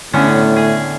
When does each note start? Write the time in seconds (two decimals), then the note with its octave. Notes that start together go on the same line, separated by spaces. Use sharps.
0.13 A2 D3 B3 C#4
0.56 G#4